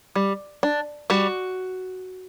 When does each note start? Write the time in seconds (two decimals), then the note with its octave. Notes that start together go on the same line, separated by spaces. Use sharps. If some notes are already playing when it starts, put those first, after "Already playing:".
0.16 G3
0.63 D4
1.10 G3 F#4